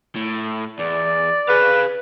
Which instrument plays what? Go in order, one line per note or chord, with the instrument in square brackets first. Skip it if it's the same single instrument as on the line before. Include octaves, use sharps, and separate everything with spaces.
[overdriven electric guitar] A2
[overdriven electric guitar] E2 [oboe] D5
[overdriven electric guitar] G#4 F5 [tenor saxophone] B4